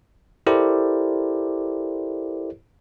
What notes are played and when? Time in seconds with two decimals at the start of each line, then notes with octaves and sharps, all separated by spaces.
0.47 E4 G4 A4 A#4 C5 D5